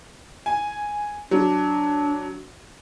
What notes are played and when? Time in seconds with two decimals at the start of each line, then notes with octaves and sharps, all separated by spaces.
0.46 G#5
1.31 F#3 D4